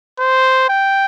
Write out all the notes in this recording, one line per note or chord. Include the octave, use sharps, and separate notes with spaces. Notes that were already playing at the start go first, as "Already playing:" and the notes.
C5
G5